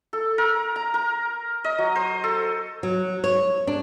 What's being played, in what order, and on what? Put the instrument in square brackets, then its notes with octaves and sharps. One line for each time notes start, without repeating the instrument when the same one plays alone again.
[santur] A4
A#4
A#5
A#4
D#5
F#3
C5
A4
[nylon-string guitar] F#3
C#5
D4